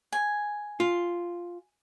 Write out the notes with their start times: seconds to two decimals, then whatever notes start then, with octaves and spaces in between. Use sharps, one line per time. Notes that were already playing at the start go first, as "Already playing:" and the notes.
0.12 G#5
0.80 F4